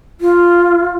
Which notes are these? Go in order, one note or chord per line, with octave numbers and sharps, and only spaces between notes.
F4